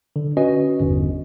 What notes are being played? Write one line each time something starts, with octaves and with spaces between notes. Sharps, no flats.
D3
C#4 F#4 B4 D#5
G1 E2